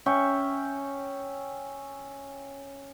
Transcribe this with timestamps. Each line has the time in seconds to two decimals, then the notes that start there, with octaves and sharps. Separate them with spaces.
0.06 C#4 E5 G5 C#6